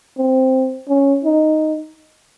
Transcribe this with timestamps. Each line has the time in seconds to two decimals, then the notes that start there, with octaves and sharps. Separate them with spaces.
0.18 C4
0.88 C#4
1.24 D#4